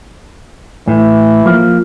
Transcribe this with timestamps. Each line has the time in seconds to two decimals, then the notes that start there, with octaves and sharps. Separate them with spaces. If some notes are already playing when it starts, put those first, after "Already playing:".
0.88 A2 E3
1.46 F3 A#3